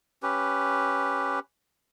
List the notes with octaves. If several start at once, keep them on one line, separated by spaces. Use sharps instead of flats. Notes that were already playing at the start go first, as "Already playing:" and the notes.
C#4 G4 B4